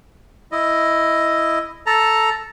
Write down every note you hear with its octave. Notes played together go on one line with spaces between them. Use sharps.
E4 D#5
A4 A5 A#5